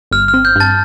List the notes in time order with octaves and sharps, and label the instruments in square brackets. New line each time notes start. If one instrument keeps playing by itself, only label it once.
[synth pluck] G1 [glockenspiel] F6
[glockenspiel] F6
[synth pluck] C4
[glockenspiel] G6
[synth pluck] G2 [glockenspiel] A5 A6